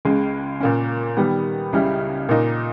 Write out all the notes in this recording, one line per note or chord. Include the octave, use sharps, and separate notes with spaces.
C#2 C#3 G#3
A#2 A#3 C#4
D#3 G3 B3
C#2 C#3 G3 C#4 E4
A#2 A#3 D#4